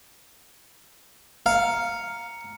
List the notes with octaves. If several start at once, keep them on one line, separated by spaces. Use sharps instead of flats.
F5 A#5 C#7